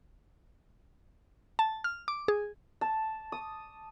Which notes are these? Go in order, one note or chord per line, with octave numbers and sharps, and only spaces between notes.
A5
F6
D6
G#4
A5
D#6